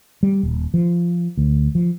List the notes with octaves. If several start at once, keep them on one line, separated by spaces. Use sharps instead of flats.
G3
D#1
F3
D2
F3